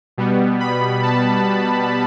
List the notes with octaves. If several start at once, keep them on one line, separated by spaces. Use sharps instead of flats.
B2 G3 B3
B5
A5